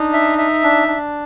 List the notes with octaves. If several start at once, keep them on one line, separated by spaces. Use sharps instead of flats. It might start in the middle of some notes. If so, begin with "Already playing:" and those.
Already playing: D4 D#4
E5
E5
D4
D4